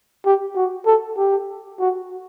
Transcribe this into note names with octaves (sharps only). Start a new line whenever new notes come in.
G4
F#4
A4
G4
F#4